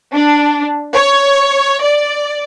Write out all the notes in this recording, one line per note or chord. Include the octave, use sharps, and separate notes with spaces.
D4
C#5
D5